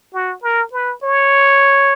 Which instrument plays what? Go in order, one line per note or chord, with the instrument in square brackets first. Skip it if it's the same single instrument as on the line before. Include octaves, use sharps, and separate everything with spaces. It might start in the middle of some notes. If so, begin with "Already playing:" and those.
[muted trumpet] F#4
A#4
B4
C#5